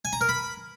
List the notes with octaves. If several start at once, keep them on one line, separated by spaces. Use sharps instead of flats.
G#5
A#5
A#4
B5